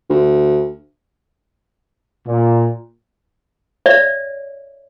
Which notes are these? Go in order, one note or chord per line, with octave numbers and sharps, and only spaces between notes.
D2
A#2
C#5 D5 E5